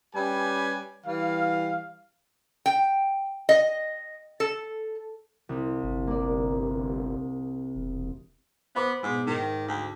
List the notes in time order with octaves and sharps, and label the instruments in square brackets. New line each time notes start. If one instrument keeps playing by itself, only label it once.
[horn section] G3 C#4 G4 B4 G#5
E3 G3 F5
[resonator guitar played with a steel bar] G5
D#5
A4
[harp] C2
[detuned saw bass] G1
[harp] A#3 D5
[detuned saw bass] E1
[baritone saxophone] B3 [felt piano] C5 B5 D6
[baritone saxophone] G#2 [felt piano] B2 G#3
[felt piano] G#2 [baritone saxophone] D#3
[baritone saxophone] D2